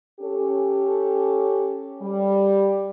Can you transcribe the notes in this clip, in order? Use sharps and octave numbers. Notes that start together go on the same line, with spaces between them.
C#4 G4 A4
G3